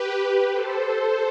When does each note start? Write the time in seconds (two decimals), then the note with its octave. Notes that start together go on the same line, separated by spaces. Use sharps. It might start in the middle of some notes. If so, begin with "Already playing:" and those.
Already playing: G4 B4
0.52 A4 C5